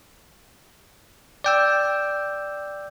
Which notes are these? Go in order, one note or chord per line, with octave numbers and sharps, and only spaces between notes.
D5 G5 E6